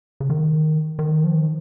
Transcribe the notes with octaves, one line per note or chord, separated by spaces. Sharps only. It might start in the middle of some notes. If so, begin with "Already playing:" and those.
C#3
D#3
D#3
F3
D#3